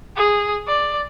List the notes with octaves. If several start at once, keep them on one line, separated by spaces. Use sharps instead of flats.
G#4
D5